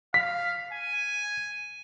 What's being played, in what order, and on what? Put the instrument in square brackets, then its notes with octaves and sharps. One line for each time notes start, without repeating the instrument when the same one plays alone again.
[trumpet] F5 [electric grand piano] B6
[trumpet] G#5